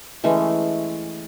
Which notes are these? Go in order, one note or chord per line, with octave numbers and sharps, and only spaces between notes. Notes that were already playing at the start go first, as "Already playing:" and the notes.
E3 G#3 A3 C#4